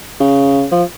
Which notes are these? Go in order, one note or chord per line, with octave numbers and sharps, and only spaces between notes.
C#3
F3